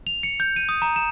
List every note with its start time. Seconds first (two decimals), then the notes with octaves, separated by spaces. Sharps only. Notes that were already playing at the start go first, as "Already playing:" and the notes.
0.07 F7
0.23 C#7
0.40 G6
0.56 D#7
0.69 D#6
0.82 A#5
0.96 E7